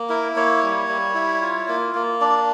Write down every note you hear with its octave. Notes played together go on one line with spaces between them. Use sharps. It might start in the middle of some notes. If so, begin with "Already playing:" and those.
Already playing: A#3
E4 A#4
A#3 C#5
G3
G3
E4
F4
A#3
A#3
D4 D5